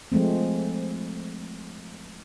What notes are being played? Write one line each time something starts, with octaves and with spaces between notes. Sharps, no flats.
F3 G#3 A3 C4